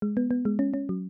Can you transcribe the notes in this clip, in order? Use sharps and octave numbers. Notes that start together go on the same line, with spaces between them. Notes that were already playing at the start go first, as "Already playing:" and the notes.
G#3
B3
B3
G#3
C#4
C#4
F#3